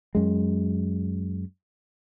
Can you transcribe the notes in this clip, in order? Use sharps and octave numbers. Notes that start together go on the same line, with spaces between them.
F#2 G#3